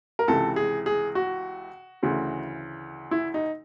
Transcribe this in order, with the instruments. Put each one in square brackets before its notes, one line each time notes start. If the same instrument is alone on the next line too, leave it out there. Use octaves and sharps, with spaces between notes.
[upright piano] A#4
C#2 C3 E3 A4
G#4
G#4
F#4
D2 C#3 E3
E4
D#4